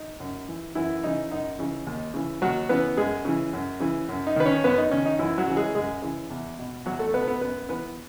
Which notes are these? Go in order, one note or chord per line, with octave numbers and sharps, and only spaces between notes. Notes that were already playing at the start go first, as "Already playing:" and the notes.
Already playing: D#4
F#2
E3
F#2 E3 E4
C#3 E3 D#4
F#2 D#4
C#3 E3
D#2
C#3 E3
D#2 F#3 F#4
C#3 E3 B3 B4
F#2 G#3 G#4
C#3 E3
F#2
C#3 E3
F#2
D#4
D#3 B4
C#4 C#5
F#2 B3 B4
D#4
D#3 C#4
D#4
F#2 E3 E4
F#3 F#4
C#3 E3
G#3 G#4
F#2 G#3 G#4
C#3 E3
E2
B2
E2 F#3 F#4
A3 A4
B2 B3 B4
A4
B3 B4
F#2 B3 B4
E3 B3 B4